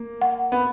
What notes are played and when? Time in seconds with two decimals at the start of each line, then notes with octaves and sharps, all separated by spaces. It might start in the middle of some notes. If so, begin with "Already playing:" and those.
Already playing: A#3
0.21 F#5
0.52 B3